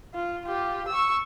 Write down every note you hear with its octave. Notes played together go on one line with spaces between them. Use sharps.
F4
F4 G4
C#6 E6